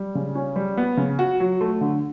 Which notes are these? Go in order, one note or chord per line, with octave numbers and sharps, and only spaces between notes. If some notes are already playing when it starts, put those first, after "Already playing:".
Already playing: G3
C#3
C#4
G3
B3
C#3
F#4
F#3
A3
D3